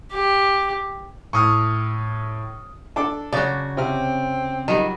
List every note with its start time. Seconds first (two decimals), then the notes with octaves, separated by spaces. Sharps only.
0.13 G4
1.33 A2 C#6 D#6 F6
2.96 D4 A4 D6
3.33 C#3 F#3 F#4 D5
3.77 C3 C4 F6
4.68 D#3 F#3 G3